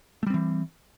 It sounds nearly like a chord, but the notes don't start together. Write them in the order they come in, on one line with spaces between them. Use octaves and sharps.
A3 G3 C4 E3